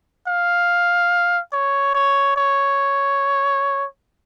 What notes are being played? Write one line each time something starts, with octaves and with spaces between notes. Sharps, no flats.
F5
C#5
C#5
C#5